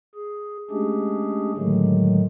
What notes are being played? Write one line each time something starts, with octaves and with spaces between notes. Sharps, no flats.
G#4
G#3 A3 C#4 D4 G4 G#4
A2 D3 D#3 F#3 G#3 A3